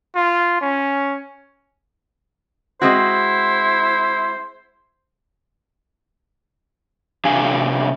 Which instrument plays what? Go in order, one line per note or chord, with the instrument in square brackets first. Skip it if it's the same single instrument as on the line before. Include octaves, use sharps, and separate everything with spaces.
[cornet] F4
C#4
[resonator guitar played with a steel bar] G#3 C4 F#4 [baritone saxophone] E4 [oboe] C5
[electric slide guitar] C3 D4 G4 F5 G#5